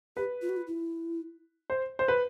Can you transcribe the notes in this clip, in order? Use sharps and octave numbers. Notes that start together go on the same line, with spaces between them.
G4 B4
F4
F#4
F4
E4
C5
C5
B4